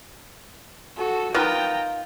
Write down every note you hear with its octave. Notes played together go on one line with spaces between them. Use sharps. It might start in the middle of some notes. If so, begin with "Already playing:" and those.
F#4 A4
D#3 B3 F4 G5 A#5